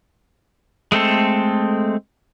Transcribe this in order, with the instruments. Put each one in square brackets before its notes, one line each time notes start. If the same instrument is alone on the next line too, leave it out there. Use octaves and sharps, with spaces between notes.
[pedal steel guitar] G#3 A3 C4 A4